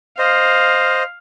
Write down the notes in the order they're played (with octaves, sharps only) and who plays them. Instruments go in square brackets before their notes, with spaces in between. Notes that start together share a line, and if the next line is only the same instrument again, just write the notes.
[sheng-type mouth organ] C5 D#5 [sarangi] F5